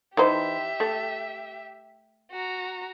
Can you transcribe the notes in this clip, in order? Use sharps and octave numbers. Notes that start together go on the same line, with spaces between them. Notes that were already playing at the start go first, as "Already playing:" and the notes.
E3 D#4 G4 C5 E5
A3
F#4 A#5